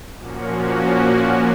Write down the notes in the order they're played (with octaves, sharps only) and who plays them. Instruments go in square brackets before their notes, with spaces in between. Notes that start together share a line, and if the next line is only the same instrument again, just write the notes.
[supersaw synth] A#2 F3 A#3 C#4 F#4